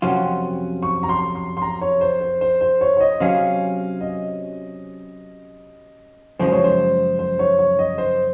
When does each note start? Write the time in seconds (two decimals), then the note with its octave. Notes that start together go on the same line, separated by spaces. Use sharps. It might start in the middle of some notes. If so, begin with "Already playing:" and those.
0.02 F2 C3 F#3 C#4 F4 F#5
0.83 C#6
1.03 A#5
1.09 C6
1.35 C6
1.57 C6
1.62 A#5
1.81 C#5
2.01 C5
2.21 C5
2.41 C5
2.61 C5
2.81 C#5
2.97 C#5
3.00 D#5
3.20 C3 F#3 C#4 G#4 F5
4.01 D#5
6.39 F#2 C#3 F3 G#3 C5
6.52 C#5
6.64 C5
7.19 C5
7.39 C#5
7.59 C#5
7.79 D#5
7.98 C5